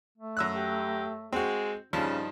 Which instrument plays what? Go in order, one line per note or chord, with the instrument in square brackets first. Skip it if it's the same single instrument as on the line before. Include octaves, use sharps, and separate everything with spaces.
[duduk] A3
[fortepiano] F#2 E6 F#6
[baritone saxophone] G4
[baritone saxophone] G#3 [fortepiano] C4 F#4
[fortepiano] G2 F3 A5 [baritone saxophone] C#3 [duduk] D#4